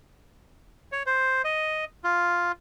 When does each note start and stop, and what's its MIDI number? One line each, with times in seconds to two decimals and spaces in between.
0.92 1.03 73
1.06 1.42 72
1.45 1.85 75
2.04 2.52 65